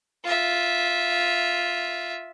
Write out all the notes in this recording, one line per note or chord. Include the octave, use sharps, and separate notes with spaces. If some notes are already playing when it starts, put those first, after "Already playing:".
F4 E5